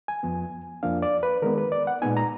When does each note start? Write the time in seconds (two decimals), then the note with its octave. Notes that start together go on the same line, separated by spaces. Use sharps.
0.08 G#5
0.23 F2 F3 B3
0.83 F2 F3 A#3 D4 F5
1.02 D5
1.23 B4
1.42 D#3 G#3 B3 A#4
1.58 B4
1.72 D5
1.87 F#5
2.02 A#2 G#3 B3 D#4 G#5
2.17 A#5